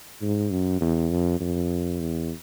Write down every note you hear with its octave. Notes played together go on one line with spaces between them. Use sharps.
G#2
F#2
E2
F2
F2
E2